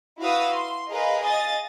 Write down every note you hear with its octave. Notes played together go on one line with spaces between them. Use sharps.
E4 F#4 B4 F5 D#6 E6
C6
G#4 A#4 B4 D#5 F5
D#5 F5 G#5 D#6 A6